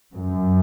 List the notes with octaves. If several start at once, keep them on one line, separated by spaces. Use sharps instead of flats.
F#2